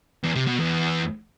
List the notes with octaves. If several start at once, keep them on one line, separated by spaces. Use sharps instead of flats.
E2
C3
B2
E2